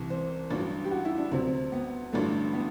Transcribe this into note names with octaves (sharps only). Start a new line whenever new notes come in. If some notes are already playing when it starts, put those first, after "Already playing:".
Already playing: C2 C3 E3
C5
A1 G2 F#3
G4
F#4
E4
D4
D2 C3 F#3 C4
B3
A1 G2 D3 F#3 A3
B3